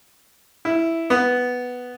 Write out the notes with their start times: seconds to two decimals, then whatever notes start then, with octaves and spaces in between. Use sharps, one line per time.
0.65 E4
1.10 B3